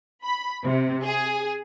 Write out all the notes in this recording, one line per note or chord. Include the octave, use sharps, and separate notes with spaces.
B5
C3
G#4